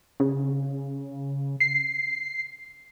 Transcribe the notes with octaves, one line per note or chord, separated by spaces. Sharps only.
C#3
C7